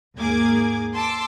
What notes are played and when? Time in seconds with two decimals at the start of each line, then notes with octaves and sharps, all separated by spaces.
0.16 D#2 G#2 A#3 G#4 D6 G#6
0.93 A5 C6 D6 E6